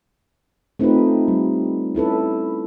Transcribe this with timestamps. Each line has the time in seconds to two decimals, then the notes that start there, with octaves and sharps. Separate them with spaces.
0.79 A3 C4 D#4 F4 G4 B4
1.28 G3
1.95 C#4 E4 A4 B4